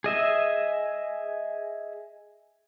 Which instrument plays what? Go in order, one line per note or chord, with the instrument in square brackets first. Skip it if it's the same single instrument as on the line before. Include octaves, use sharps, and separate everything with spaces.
[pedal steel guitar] G#4 D#5 E5